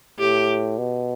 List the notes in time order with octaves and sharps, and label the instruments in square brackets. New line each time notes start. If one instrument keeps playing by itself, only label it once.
[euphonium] A2 [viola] G4
[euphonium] B2